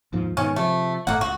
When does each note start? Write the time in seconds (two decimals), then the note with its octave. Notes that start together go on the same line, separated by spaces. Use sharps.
0.13 D#2 G#2 F3
0.37 G#2 B2 D#3 C#4
0.56 C3 F3 A3
1.07 G1 A2 A3 A#3 F#5
1.21 C#2 F#4